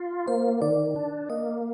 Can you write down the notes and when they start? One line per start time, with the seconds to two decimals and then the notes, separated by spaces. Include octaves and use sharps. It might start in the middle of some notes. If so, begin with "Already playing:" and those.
Already playing: F4
0.27 A#3 C5
0.61 D#3 D5
0.96 D4
1.30 A#3 D#5